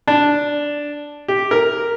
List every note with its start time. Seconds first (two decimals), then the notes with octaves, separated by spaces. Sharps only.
0.07 D4
1.28 G4
1.51 A#4